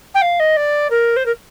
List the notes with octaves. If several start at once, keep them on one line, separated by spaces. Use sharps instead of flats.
G5
F5
D#5
D5
A#4
C5
A#4